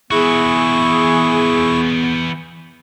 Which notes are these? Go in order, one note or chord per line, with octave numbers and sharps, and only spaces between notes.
E3 B3 E4 F#4 G#4 C#6